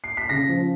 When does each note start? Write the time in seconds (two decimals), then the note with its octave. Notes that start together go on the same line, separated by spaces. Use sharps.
0.04 C7
0.17 B6
0.29 C#3 A#6
0.49 F3